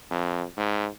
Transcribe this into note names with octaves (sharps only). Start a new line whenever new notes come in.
F2
G#2